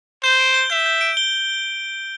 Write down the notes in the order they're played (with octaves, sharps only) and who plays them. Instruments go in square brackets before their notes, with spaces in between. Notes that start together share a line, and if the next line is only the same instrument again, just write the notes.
[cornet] C5 [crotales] G6
[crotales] D7
G7
[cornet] E5 [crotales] G6
[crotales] G6
D7
G7